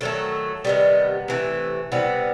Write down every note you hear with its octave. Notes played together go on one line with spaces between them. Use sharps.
D#3 F#3 A3 A4
C3 D#3 G3 B3
C3 E3 A3
C3 E3 G3 B3